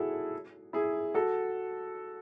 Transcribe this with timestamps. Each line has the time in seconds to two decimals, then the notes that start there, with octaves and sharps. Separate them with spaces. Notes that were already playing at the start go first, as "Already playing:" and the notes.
Already playing: E4 F#4 G#4 A4
0.73 E4 G#4
1.14 F#4 A4